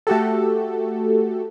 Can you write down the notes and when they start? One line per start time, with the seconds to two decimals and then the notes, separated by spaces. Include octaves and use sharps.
0.07 A3 F#4 G4 A4